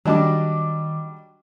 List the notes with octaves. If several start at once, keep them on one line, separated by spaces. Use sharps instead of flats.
D#3 F#3 G3 D4 G#4 D#5 A5 D6